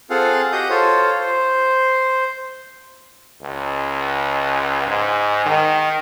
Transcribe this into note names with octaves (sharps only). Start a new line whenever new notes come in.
C4 F4 G#4 A4 F5 F#5
F#4 G4 D#5 F#5 D#6 G6
F4 A4 C5 C#5
C5
C#2
G#2
D#3